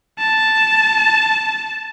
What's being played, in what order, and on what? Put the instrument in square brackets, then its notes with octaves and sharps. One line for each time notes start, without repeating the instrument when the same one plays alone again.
[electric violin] A5